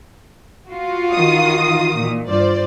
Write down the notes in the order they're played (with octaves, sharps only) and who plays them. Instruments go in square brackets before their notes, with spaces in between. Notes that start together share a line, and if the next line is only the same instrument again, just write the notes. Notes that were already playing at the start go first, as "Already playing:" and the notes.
[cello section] F4 F#4
[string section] D#3 E3 D#6
[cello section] A#2
[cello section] G2 [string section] F4 C5 D5